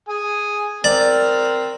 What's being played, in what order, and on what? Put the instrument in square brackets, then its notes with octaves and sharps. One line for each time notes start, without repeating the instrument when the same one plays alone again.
[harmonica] G#4 G#5
[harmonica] C4 A#4 [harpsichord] D5